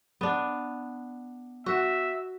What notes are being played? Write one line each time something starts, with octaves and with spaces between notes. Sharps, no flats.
B3 D4
F#4 E5